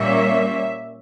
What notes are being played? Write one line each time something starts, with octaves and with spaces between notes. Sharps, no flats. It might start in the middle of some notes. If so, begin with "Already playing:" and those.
Already playing: A#2 G3 A#3 C#4 E5